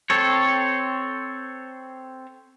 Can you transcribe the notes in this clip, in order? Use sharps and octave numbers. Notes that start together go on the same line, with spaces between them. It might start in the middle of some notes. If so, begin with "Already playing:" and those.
C4 A4 C#5